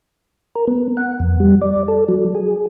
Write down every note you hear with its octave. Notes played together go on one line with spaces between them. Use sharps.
A#4
B3
F#5
F2
G3
D5
A4
F#3
G#4